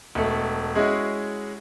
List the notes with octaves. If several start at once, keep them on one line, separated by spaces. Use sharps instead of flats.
E1 A3
G#3 C#4 E4 F#4 G#4